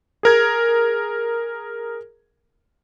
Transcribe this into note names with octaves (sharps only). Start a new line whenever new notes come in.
G#4 A#4 G#6